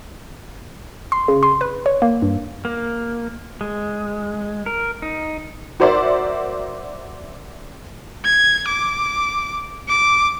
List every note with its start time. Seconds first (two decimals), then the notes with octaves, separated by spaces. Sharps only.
1.12 C6
1.28 C#3
1.43 C6
1.61 B4
1.86 C#5
2.02 A#3
2.22 G2
2.65 A#3
3.61 G#3
4.66 A#4
5.02 D#4
5.80 F#4 A#4 C5 D5 E5 C6
8.25 G#6
8.68 D6
9.89 D6